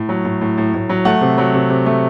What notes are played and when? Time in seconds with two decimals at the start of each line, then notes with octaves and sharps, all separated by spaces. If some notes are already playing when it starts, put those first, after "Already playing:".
Already playing: A2
0.09 F#3
0.25 A2
0.41 A2
0.58 A2
0.74 A2
0.89 F#3
1.05 A3 F#5
1.21 C3
1.38 F#3
1.54 C3
1.70 C3
1.86 A3